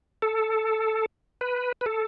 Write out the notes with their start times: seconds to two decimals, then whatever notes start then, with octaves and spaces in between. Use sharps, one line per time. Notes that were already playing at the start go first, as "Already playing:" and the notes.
0.22 A4
1.41 B4
1.81 B4
1.86 A4